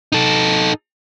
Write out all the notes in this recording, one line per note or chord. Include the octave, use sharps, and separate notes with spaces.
D#4 A4